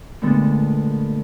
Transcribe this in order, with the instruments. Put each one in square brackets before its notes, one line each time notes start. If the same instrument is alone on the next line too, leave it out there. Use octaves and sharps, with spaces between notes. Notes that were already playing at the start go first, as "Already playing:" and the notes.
[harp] A#2 D3 G#3 A3 B3